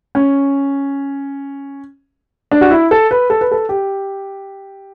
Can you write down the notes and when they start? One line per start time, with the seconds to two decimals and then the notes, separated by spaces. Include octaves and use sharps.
0.15 C#4
2.51 D4
2.61 F#4
2.71 E4
2.91 A4
3.11 B4
3.30 A4
3.41 B4
3.51 A4
3.69 G4